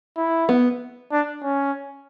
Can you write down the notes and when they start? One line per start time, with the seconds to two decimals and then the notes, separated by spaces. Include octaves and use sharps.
0.17 E4
0.49 B3
1.12 D4
1.43 C#4